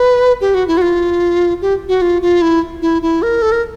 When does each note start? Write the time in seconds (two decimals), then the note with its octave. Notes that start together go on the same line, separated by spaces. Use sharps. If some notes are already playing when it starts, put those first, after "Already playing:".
Already playing: B4
0.41 G4
0.54 F#4
0.68 E4
0.77 F#4
0.81 F4
1.62 G4
1.89 F#4
2.02 F4
2.22 F4
2.42 E4
2.82 E4
3.02 E4
3.22 A#4
3.42 A4
3.52 A#4